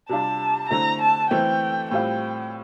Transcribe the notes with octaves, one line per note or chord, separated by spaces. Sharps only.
C3 G3 D4 F4 A5
D3 A3 C4 E4 A#5
A5
E3 A3 C4 G5
A2 G3 C4 F4 G5